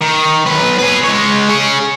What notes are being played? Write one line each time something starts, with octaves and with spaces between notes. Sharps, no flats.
D#3
B1 B4
G#4 B4
G#3 C#5
G#4 C#5